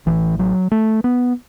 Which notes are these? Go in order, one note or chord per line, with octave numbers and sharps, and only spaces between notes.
A1 A2 E3
F#3
A3
B3